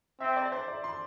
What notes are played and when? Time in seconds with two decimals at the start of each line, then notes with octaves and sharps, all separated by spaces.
0.20 C4 E5
0.36 D5
0.52 C5
0.68 D5
0.84 C6